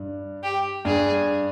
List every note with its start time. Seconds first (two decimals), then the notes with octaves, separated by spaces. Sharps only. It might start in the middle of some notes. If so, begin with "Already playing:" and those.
Already playing: G2
0.43 G4
0.85 G2 G#4